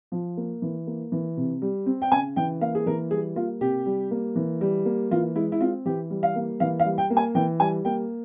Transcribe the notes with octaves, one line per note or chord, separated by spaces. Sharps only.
F3
A#3
E3
A#3
E3
C3
G3
C4
G5
C#3 G#5
E3 G5
A#3 F5
G#4
E3 A#4
G3 G#4
A#3 F4
C3 G4
G3
A#3
E3
G3
A#3
E3 F4
G#3 E4
E4
C4 F4
E3 G4
G3
F5
A#3
E3 F5
F5
G3
G5
A#3
G#5
E3 G5
G3 G#5
A#3 G5